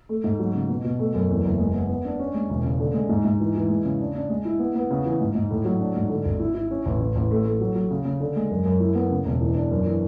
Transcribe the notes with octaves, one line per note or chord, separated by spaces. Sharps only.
A3
G#2
F#3
C#3
B2
B2
A3
F#2
E2
F#1
G#3
B3
B3
D4
C#4
G#3
E1
C#3
D3
G#3
G#2
G#2
E3
E3
G#3
C#3
D4
D4
G#3
E4
B3
B3
C#3
E3
G#2
G#2
A2
F#3
D4
G#2
D3
G#1
E4
E4
C#4
A1
A1
A1
A3
A3
F#3
F#3
C#3
C#3
D3
G#3
F#2
F#2
E4
B3
C#3
E1
E3
D4
F#2
E3